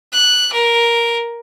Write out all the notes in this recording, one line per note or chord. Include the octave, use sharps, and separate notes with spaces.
F#6
A#4